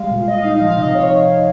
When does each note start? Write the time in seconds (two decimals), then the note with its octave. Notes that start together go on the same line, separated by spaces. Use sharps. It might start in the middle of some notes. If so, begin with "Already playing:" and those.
Already playing: G3 G#3 F5
0.11 A#2
0.27 A#2 D#5
0.40 D#4 F5
0.53 D#5
0.61 F3 F5
0.77 C3 D#5
0.95 C3 C#5